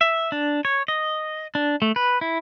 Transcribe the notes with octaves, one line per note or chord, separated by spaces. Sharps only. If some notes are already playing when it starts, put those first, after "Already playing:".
E5
D4
C#5
D#5
D4
A3
B4
E4